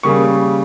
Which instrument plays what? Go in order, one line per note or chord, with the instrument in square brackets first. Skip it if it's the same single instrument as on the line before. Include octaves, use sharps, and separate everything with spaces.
[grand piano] C#3 G3 A#3 C#6